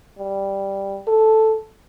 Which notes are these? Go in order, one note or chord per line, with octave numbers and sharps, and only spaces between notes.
G3
A4